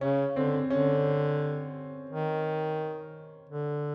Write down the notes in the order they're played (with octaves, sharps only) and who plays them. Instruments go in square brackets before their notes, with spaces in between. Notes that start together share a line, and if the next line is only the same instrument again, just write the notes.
[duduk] C#3 [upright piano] C#4
[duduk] D3 [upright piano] C4
[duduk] D3 [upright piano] C#4
[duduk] D#3
D3